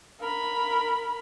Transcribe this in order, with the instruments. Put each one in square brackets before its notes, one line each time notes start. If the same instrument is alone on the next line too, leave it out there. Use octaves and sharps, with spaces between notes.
[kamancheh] A#4 B5